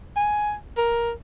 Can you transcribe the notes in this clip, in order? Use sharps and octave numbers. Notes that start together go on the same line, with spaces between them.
G#5
A#4